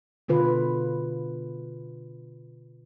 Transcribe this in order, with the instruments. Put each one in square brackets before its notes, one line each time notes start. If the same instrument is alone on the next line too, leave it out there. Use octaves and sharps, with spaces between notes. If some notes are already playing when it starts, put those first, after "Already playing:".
[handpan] B2 D3 F4 B4